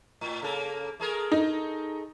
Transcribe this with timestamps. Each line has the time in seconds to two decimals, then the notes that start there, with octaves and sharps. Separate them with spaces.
0.21 A2
0.42 C#3 A#3 A4
1.00 A3 G#4 A#4
1.32 D#4